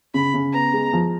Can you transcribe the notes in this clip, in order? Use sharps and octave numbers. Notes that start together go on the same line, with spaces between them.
C#3 B5
C#3
B3 A#5
G#3
F3